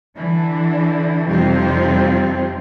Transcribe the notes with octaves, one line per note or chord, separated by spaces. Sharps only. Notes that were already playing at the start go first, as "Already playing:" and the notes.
D3 E3 D4
F2 C3 G3 C4 D#4 F4